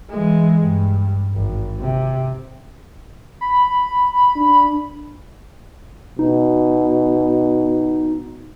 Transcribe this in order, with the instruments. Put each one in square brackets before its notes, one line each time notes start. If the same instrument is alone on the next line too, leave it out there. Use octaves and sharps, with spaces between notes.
[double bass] E3 G#3
G2
G#1
C3
[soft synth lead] B5
[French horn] D4
[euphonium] B2 [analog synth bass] D#4